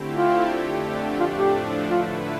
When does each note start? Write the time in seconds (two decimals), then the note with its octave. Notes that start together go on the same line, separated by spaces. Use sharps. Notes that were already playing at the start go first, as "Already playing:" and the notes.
Already playing: D3 A3 C4 E4 G4
0.13 F4
0.48 F2 D3 A3 D4 G4
1.20 A2 F3 A3 D4 F4
1.37 G4
1.91 D3 A3 E4 F4 B4